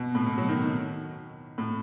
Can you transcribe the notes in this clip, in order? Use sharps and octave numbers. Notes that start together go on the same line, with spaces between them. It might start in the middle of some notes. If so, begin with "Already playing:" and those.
Already playing: B2
A2
B2
F#3
D#3
A2